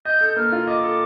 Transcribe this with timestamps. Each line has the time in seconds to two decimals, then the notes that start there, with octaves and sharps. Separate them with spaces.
0.05 D#5 G6
0.21 A4
0.29 G6
0.36 A#3 F6
0.52 F4
0.67 D#5 D6
0.83 A4